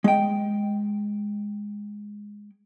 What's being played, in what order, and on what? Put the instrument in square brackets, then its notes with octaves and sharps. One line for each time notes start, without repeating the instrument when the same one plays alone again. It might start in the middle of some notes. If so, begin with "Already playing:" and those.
[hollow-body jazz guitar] G#3 G5